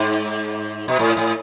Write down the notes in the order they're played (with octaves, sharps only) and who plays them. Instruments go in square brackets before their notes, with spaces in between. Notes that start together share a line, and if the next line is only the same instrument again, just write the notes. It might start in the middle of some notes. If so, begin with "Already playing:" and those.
Already playing: [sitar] G#2
B2
A2
A2